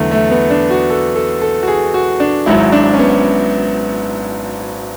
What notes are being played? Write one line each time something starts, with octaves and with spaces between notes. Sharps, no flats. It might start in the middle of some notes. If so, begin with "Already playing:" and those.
Already playing: E2 D3 F#3 A3 B3
A3
B3
D4
F#4
A4
A4
A4
F#4
G#4
F#4
D4
G#1 G#2 F#3 E4
D4
C#4
B3